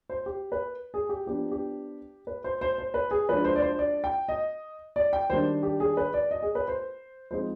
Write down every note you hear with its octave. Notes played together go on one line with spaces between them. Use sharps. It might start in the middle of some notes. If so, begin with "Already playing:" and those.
C5
G4
B4
G#4
G4
F3 B3 D4 G4
G4
B4
C5
C5
C5
B4
G#4
F3 G#3 D4 B4
C5
D5
C5
D5
G5
D#5
D5
G5
D#3 G3 D4 C5
G4
G#4
B4
D5
D#5
G#4
B4
C5
F3 G#3 C4 D#4 C5